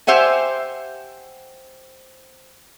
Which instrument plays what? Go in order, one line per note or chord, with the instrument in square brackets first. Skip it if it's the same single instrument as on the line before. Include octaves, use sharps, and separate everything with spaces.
[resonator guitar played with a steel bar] G4 C5 E5 F#5 G#5